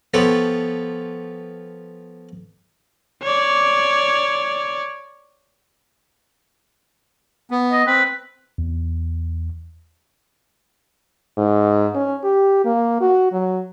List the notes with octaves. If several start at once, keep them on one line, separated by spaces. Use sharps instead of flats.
F3 B3 F4 G4 A4 C#5
C#5 D5
B3
D#5
C4 B4
E2
G#2
C#4
G4
A#3
F#4
F#3